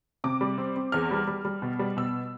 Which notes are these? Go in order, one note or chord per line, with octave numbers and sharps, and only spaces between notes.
C3 D6
G3
C4
C4
E2 F6
G3
G3
G3
B2
G3
B2 E6